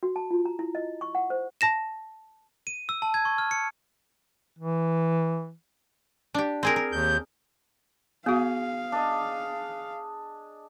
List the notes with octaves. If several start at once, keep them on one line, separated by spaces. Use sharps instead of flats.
F#4
A5
F4
A#5
E4
D#5
C#6
F#5
C5
A5 A#6 E7
D#7
E6
A5
G#6
C#6
F6
C#7
E3
D4 G4
C4 G#4 A#4
A#4
D#2 G6
B3 F#4 G#4 F5
D4 D#5